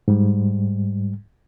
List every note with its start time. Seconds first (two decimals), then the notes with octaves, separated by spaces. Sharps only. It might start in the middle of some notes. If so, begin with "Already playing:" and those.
0.08 G#2 G3